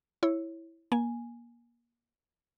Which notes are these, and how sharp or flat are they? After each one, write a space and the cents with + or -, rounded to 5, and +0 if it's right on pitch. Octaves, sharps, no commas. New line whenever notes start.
E4 +0 C#5 -15
A#3 +25 G#5 +0